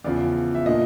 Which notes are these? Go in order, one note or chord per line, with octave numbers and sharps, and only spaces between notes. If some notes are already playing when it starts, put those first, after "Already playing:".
E2 C#3 F3 D5
E5
A#2 F3 A#3 D4 D#5